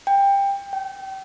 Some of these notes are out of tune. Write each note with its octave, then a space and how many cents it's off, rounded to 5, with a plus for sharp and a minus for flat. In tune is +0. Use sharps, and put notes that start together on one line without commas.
G5 +20
G5 -30